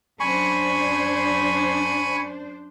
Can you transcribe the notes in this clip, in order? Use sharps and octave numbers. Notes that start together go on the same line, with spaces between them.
F#2 D4 C5 G#5 B5 C#6